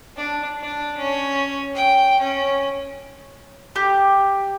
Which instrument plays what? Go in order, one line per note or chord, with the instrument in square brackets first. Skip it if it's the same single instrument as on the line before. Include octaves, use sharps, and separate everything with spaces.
[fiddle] D4
D4
C#4
G5
C#4
[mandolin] G4